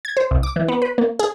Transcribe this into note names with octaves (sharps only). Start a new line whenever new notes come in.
G#6
C5
C2
D6
E3
B3
B4
A#3
G#4